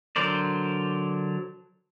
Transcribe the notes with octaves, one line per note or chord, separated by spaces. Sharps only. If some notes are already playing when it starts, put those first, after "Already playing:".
D3 F#3 A#4 C5 D5